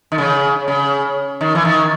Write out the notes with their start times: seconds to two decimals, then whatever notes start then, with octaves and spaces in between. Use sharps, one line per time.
0.12 D#3
0.18 C#3
0.68 C#3
1.41 D#3
1.55 E3
1.65 D#3